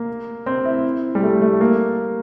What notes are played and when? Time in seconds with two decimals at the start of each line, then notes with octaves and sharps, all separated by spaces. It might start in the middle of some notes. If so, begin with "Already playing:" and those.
Already playing: A#3
0.46 C4
0.65 E4
1.15 G3
1.23 A3
1.41 A3
1.61 A#3